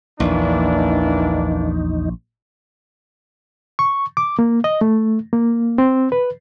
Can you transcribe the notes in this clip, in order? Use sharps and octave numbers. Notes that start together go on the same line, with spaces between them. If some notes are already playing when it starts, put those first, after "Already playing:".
A#1 E2 E3 A#3 D4 D#4
C#6
D6
A#3
D#5
A3
A#3
C4
B4